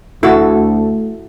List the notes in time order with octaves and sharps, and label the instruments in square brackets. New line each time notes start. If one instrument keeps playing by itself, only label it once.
[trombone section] D2 [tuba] A3 [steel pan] E4 F#4 [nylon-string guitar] A4